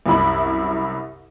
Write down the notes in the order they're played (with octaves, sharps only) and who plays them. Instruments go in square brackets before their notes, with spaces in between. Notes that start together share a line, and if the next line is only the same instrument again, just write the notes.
[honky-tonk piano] C2 F#2 E4 B5